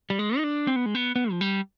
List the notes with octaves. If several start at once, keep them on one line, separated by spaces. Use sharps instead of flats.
G3
G#3
D#4
D4
C4
B3
G#3
B3
B3
F3
G3